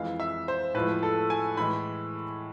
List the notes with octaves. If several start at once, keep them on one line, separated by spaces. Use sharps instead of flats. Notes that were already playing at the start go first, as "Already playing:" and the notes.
Already playing: F2 E3 G#3 F5
E5
C5
A2 F3 G#3 B4
A4
G#5
A2 E3 G#3 B5